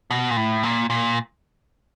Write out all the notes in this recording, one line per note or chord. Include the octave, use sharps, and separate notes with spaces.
B2
A#2
A2
A#2
A#2